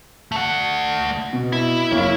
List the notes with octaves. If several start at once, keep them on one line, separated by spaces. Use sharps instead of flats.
A3 F#5
B2
E4
F#1 A#3 C#5